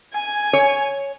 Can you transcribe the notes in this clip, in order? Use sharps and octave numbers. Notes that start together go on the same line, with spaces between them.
G#5
C#5